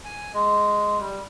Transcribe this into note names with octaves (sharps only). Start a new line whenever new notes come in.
G#5
G#3
G3